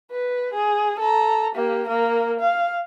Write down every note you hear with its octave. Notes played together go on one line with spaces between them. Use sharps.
B4
G#4
A4 A#5
A#3 G4
A#3 A#4
F5